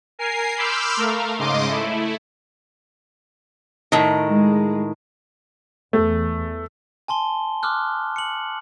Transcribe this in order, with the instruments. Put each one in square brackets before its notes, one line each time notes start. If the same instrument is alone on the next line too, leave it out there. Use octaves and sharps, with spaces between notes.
[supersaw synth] A#4 G#5 C7
B5 C6 D6 E6 F6 G6
A3 A#4 F5
G#2 C#3 D#5 C6 D6
A3 E4
[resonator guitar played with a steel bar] A2 D#3
[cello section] G#3
[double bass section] E2 [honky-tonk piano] A3
[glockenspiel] G#5 A5 C6 G7
C6 D6 D#6 F6 F#6
C#7 F#7